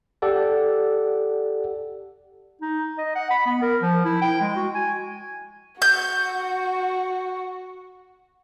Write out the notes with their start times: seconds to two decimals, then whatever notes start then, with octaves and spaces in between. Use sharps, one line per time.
0.22 G4 A4 D5 F#5
2.61 D#4
2.98 D#5
3.15 F#5
3.31 B5
3.46 B3
3.62 A#4
3.82 F3
4.05 E4
4.22 G5
4.41 G#3
4.56 F#4
4.75 G#5
5.82 F#4 G6